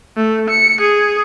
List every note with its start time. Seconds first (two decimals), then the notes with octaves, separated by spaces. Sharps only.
0.17 A3
0.50 C#7
0.81 G#4